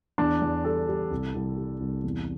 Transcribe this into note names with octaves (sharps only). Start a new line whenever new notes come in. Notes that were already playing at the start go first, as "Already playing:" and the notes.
E2 D4
E2
G3 A4
G3
C2
C2
G3
C2
E2